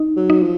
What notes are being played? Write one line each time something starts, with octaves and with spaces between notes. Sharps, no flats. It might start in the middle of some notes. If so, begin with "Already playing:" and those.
Already playing: D#4
F#3
D#4
F3